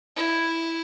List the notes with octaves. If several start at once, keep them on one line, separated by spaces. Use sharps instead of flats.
E4